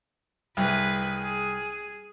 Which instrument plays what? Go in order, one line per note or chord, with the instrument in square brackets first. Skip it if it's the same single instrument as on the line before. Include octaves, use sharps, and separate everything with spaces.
[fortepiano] C2 [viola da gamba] G#4 B4
[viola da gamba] G#4